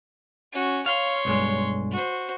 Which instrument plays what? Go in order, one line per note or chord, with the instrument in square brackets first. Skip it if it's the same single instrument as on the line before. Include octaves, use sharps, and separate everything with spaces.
[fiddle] C#4 F#4
[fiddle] C#5 C6 [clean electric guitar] F5
[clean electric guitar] B1 G2 G#3
[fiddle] F#4 C5